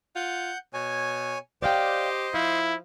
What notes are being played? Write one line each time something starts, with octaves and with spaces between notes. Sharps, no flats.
F4 F#5 G6
B2 C#5 G#5
G4 C5 D5 D#5 F5 G5
F3 E4 F5